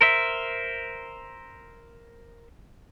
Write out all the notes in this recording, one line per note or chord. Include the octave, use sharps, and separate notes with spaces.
A#4 C5 E5